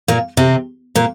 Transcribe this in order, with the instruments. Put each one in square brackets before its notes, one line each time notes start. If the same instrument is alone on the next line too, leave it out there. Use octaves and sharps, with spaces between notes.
[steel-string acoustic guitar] A#2 A#3
C3 C4
A#2 A#3